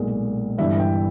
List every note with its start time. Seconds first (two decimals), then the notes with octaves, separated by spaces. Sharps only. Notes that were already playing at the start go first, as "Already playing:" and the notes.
Already playing: B1 A#2 G#3
0.58 G1 G2 E3 G3 E5
0.80 G5